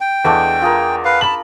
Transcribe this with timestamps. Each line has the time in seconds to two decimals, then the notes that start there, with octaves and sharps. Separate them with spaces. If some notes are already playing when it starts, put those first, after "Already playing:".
0.01 G5
0.25 E2 G#3 A3 D4
0.62 F4 G#4 A#4
1.05 B4 F5
1.21 A5 B5 F#7